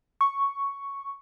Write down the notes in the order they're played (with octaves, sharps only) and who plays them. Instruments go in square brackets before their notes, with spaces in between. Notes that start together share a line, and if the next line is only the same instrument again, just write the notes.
[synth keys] C#6